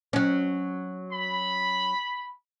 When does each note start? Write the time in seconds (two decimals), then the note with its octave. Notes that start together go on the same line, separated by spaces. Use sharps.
0.13 F#3 C#4
1.13 B5